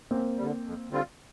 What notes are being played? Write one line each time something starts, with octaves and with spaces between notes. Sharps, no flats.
F#2 A#3 C4
D3 G3
F2
D3 G3 C4 F4